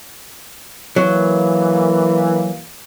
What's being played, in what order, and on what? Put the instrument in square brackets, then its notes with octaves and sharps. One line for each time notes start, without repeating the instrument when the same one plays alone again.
[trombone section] E3 A#3 [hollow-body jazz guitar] F#3